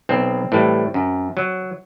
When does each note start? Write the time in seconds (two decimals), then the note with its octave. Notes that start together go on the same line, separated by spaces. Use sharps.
0.09 B1 C4
0.52 A2 E3 G3
0.94 F#2
1.37 F#3